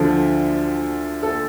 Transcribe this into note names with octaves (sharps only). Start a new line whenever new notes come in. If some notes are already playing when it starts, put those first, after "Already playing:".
Already playing: D2 D3 F3 A4
A4